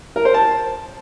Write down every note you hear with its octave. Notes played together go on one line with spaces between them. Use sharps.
A#4
C5
A5